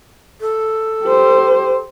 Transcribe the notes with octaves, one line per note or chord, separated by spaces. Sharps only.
A4
G4 C5